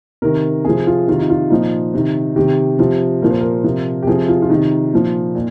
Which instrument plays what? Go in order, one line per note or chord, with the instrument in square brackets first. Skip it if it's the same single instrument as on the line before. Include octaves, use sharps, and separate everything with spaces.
[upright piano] C3 D#3 A#4
C3 F3 G#4
F4
C3 D#3 F4
D#4
F4
A#2 F3 D#4
C3 D#3
C3 D#3 G4
C3 F3
A#2 F3 A#4
C5
A#4
C3 F3
G4
C3 F3 G#4
F4
F4
C3 D#3 D#4
A#2 F3
A#2